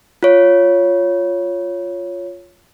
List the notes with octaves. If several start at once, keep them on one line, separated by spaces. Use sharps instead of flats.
F4 C#5